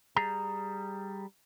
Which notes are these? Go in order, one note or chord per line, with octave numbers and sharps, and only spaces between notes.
G3 G#4 A#5